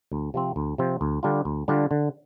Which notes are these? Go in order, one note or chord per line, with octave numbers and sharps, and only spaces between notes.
D2
C3 F3 C4
D2
C3 F3 C4
D2
D3 G3 D4 F4
D2
D3 G3 D4 F4
D3